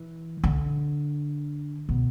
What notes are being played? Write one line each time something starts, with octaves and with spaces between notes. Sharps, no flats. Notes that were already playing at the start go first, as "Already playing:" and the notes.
Already playing: E3
D3
B2